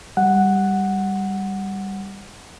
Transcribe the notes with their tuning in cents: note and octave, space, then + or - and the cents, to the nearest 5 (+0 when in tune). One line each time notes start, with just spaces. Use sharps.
G3 +0 F#5 +0